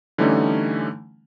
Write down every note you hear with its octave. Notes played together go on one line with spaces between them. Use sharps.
D3 E3 G3 A3 C#4 D#4